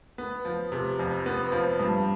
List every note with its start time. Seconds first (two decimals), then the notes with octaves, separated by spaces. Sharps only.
0.18 B3
0.45 F3
0.72 C3
0.99 F2
1.26 B3
1.52 F3
1.79 G2